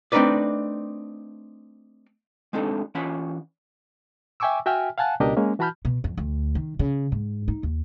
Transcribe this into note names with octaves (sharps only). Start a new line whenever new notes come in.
A3 C4 D4 D#4 B4 D5
G#3 C4 D4 D#4 A4
E3 C#4 F4 F#5 B5
E5 G5 G#5 C#6 D6 E6
F#4 E5 G5 G#5 F6
F5 F#5 G#5 A5 F#6
C#2 B2 D4 G4 A#4 D#5
G#3 A#3 C#4
E3 F#4 A5 B5 F6 G6
B2
F2
D2
D#3
C#3
G#2
D#4
D#2